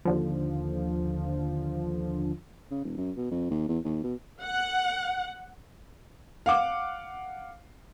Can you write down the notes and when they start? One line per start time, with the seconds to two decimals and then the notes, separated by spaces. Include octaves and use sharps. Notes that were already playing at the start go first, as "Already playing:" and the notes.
0.05 D#2 D3 F3
2.71 C#3
2.85 E1
2.98 F#2
3.17 B2
3.31 F2
3.50 D#2
3.69 E2
3.84 D#2
4.04 B2
4.43 F#5
6.46 F5 F#5 D6